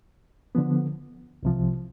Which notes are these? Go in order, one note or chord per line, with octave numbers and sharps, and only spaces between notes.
D3 F3 B3
C2 C3 F3